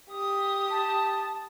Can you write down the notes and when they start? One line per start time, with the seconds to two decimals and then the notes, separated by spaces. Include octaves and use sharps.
0.11 G4 D#6
0.70 A5